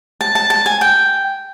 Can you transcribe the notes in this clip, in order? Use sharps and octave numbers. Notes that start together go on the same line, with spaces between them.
A5
A5
A5
G#5
G5